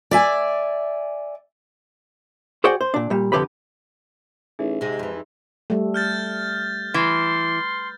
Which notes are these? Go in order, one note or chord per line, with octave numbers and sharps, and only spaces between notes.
D5 E5 G#5
F#4 G#4 C5 D5 F#5 G5
C5
A#2 D4
A#2 G3
F2 G#2 D3 G4 B4 B5
A1 D#4 G#4 E5
G#2 C3 G#3
F2 E3
G3 A3
F6 G6 A6
E3 C6